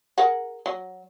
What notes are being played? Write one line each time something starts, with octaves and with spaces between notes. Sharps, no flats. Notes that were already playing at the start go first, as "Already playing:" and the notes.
G#4 A#4 F#5
F#3